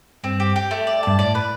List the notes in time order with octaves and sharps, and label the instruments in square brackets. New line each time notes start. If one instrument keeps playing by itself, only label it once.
[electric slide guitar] G2 [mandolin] C4
[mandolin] G4
G4
A3
D5
[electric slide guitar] G2 [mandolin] A5
[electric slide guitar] A2 [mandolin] D5
[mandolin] B4